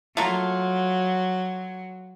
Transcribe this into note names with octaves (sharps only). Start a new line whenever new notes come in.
F#3 A3 A#3 F4